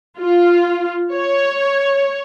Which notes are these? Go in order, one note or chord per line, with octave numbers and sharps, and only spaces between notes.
F4
C#5